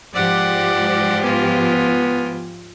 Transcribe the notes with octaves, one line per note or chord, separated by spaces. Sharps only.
G#2 F3 G4 D5 F#5
B3 F4 G#5